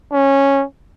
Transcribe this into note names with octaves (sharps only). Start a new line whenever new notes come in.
C#4